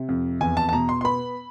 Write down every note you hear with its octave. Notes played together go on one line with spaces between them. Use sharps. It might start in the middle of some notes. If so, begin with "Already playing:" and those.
Already playing: C3
F2
E2 G#5
A5
A5
B2 A#5
C6
C6
B3 B5